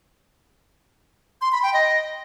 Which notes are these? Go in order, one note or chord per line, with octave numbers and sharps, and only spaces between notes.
C6
B5
G5
D#5